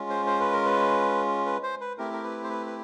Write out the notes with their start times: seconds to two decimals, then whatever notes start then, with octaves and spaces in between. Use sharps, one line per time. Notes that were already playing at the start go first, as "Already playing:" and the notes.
Already playing: G#3 C#4 F4
0.10 C5
0.26 C5
0.40 B4
0.52 A#4
0.66 B4
1.46 B4
1.63 C5
1.81 B4
1.98 A3 C4 E4 G4 A#4
2.13 A#4
2.24 B4
2.44 C5
2.49 B4
2.66 B4